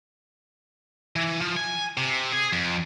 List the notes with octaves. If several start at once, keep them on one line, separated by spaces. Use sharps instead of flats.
E3
F3
G#5
C3
G#4
F2